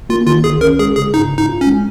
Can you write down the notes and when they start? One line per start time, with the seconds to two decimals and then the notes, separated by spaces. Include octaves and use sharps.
0.10 A#3 F4
0.27 D#3 F4
0.44 C#2 G#4
0.61 C#4 A#4
0.79 G#3 G#4
0.97 C#3 G#4
1.14 G#2 D#4
1.32 G#2
1.38 D#4
1.49 F4
1.61 C#4
1.66 G#3